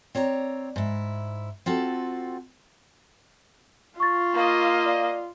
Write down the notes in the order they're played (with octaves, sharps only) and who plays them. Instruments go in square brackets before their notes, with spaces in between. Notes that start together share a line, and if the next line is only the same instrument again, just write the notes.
[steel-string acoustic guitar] C4 C#5 D5 A#5
G#2 E4
C4 F4 F#4 A4
[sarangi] F4 [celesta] C#6 A6
[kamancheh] A#3 D#5
[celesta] D5 F5